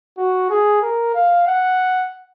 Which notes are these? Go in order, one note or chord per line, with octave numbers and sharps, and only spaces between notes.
F#4
G#4
A#4
F5
F#5